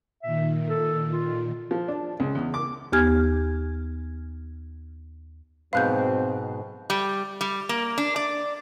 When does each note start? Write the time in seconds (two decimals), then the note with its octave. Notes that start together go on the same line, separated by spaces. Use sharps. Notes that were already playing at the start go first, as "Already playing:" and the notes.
0.23 A#2 D#3 E5
0.69 A4
1.11 F4
1.71 F3
1.88 D4
2.20 C#2
2.35 E2
2.54 D6
2.92 D#2 B3 G4 G#5 F6 G#6
5.73 G#2 B2 F#3 C4 B4 F5 F#6 G6
6.90 G3
7.41 G3
7.69 A#3
7.98 D4
8.16 D5